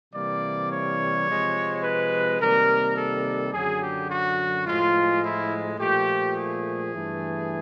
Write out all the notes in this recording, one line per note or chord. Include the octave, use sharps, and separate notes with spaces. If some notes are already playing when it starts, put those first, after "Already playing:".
C3 E3 G3 A#3 D5
C#5
C3 F3 G#3
B4
C3 D#3 G3 A#3 A#4
A4
F#2 D3 F#3 G#4
G4
F#4
A2 F3 G#3 F4
E4
A#2 F3 A3 G4
G#4
G2 E3 A3